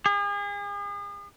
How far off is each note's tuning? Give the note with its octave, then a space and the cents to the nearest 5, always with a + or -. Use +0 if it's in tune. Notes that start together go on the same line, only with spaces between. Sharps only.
G#4 -40